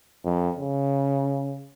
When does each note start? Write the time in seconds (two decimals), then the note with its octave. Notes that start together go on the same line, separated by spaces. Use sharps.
0.25 F2
0.56 C#3